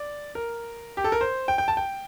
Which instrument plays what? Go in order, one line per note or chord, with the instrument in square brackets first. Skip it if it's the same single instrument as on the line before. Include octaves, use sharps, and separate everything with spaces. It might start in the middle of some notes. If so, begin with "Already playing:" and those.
Already playing: [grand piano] D5
A#4
G4
A4
A#4
C5
G5
G5
A5
G5